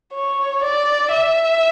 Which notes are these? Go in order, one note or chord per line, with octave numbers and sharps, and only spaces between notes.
C#5
D5
E5